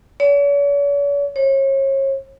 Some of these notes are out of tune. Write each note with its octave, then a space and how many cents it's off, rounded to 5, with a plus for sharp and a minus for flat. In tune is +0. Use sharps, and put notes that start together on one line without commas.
C#5 +45
C#5 -35